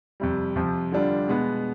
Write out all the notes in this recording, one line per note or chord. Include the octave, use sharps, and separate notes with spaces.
F2 C3 G3
F2 C3 F3
D3 G3 D4 F4
B2 G#3 B3